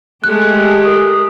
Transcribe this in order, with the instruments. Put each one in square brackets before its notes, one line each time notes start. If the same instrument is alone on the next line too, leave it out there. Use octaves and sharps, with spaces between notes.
[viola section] G#3 A3 [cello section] G4 [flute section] A4 [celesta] F#6
[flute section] A4 A#4 D#6